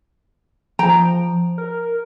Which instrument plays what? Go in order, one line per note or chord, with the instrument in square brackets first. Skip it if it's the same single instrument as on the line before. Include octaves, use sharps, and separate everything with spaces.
[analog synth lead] F3 [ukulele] G5 A#5
[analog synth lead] A#4